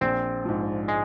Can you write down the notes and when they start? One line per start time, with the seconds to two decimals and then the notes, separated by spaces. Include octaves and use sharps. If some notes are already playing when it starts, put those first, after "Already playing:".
0.01 A#1 C4
0.45 G#2 F3
0.88 G#3